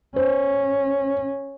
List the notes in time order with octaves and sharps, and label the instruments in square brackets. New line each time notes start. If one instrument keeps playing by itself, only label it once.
[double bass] C#4 [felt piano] C5